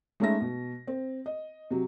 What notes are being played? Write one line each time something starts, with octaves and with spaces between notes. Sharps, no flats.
G#3 A3 C#4 D#4 E5 A#6
B2
C4
D#5
C3 F#3